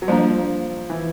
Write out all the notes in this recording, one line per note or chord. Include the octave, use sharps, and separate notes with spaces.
F#3
F3 G3 A#3 D4
E3